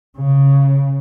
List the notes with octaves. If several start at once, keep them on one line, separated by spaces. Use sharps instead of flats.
C#3